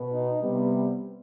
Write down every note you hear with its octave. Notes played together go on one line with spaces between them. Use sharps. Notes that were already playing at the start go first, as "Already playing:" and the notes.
Already playing: B2 B3
D#4
C3 G3 B3